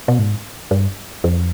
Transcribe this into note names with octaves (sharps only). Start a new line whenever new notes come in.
B2
G#2
G2
F2